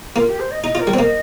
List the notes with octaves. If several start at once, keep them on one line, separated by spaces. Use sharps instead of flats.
A#3 F4
G4
C5
D#5
D#4 D#5
F4 A#4
G3
A#3 C4 D#5